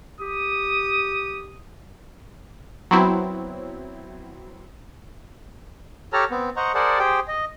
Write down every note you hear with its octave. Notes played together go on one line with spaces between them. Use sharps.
G4 D#6
F#3 B3 C4 E4
G4 A4 C#5 A5 A#5 F6
B3 C4
C5 D#5 F#5 A#5 C#6
G#4 A#4 C5 D5 F#5 A5
G4 G#4 C5 G5
D#5